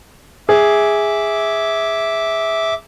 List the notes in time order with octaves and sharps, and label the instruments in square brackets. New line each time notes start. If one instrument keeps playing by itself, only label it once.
[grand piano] G#4 [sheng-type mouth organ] E5 D6